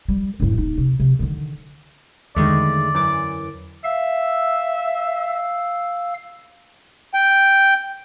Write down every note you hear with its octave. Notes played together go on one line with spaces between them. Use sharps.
G3
F#2 A2
D#1 D#4
C3
C3
D3 D#3
E2 D3 D#3 G#3 A3 D5
F#2 E3 D6
E5 F5 E6
G5